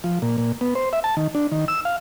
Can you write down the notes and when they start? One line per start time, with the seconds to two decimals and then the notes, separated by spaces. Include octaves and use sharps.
0.04 F3
0.22 A#2
0.38 A#2
0.61 B3
0.75 C5
0.93 E5
1.04 A5
1.17 D#3
1.35 D4
1.52 D#3
1.68 E6
1.85 F5